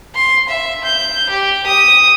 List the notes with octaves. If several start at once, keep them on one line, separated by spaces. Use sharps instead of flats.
C6
E5
G6
G4
D#6